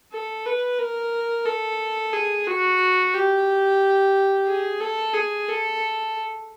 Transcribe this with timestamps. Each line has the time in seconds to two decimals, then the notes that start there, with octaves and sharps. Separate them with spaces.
0.12 A4
0.46 B4
0.79 A#4
1.45 A4
2.13 G#4
2.47 F#4
3.14 G4
4.47 G#4
4.80 A4
5.14 G#4
5.49 A4